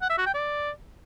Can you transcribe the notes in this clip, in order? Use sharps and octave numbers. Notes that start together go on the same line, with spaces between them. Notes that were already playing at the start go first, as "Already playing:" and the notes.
F#5
E5
F#4
G5
D5